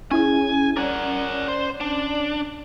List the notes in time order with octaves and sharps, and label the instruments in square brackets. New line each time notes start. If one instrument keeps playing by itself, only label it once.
[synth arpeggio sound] C#4 E4 G#4 [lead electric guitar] G#5
[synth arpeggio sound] C#4 D5 [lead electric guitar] A#4 F#5
[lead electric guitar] C5
D4